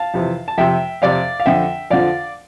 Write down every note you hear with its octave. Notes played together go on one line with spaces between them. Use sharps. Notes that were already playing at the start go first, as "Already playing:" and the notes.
Already playing: F5 A5
F2 C3 E3
A5
F2 C3 F3 E5 G5
F2 C3 F3 D5 F5
F5
F2 D3 F3 E5 G5
F2 D3 F3 D5 F5